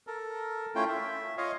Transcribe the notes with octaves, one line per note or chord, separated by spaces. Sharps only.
A4 A#4
A3 C#4 E4 F4 G5
E5
F4 C#5 D#5 F5